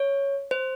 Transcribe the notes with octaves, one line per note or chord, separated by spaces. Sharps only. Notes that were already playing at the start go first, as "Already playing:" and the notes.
Already playing: C#5
C5